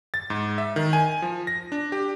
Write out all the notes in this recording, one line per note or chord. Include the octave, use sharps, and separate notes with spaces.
A6
G#2
E5
D#3
G#5
F3
A#6
D4
G4